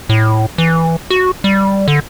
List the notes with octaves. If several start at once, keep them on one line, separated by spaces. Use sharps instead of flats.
A2
E3
F#4
G3
D3